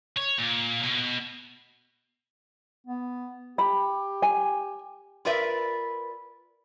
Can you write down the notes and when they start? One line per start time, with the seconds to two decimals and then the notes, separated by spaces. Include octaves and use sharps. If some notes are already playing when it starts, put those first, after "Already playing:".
0.17 C#5
0.39 A#2
0.83 B2
2.86 B3
3.58 G4 B5
4.22 G#5
5.25 F4 A#4 B4 D5 E5